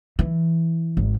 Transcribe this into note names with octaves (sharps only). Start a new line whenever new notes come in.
E3
G#1